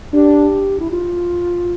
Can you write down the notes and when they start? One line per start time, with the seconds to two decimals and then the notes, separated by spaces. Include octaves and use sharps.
0.12 D4 G4
0.79 E4
0.91 F4